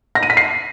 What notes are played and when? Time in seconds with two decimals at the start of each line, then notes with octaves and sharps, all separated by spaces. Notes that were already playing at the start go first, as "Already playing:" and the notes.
0.15 A#6
0.23 D#7
0.30 B6
0.37 C7